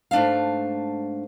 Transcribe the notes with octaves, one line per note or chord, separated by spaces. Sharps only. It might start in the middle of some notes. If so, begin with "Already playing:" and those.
G#2 A3 D4 E5 F5